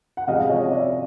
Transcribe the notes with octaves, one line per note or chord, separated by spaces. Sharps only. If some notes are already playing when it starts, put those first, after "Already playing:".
F#5
C3 F3 G#3 D#5 F5
C#5 D#5
D5 E5